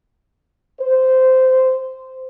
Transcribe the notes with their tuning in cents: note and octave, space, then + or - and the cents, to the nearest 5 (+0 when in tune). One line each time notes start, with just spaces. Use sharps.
C5 -15